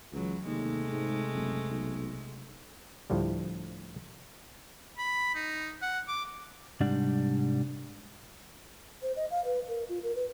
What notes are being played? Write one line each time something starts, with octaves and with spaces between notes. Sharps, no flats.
C#2 E3 F#3
D#2 C3 G#3 A3
G#2
F#1
B1
D2 A2 F3 G3
B5
D#4
F#5
D6
C2 G#2 G3 D4 F#5
C5
D#5
F5
B4
A#4
F4
A#4
B4